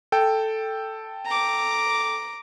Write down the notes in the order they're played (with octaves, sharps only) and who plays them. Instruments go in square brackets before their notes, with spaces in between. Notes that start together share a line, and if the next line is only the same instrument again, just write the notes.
[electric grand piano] A4 G5
[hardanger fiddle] A#5 D6